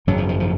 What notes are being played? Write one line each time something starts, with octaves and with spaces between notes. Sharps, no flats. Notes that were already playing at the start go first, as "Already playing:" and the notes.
G#1 F#2 C#3 F#3
F3
F3
F3